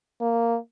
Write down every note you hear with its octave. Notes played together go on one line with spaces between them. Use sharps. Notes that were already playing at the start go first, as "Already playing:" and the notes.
A#3